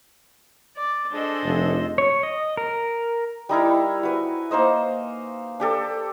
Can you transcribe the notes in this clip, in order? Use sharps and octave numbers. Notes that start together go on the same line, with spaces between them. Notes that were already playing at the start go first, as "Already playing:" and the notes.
D5
D4 G#4 A4 C5 D#5
F1
C#5
D#5
A#4
G3 D#4 E4 A#4
F#4 B4 G#5
A#3 D#4 C5 D#5
D4 G4 A4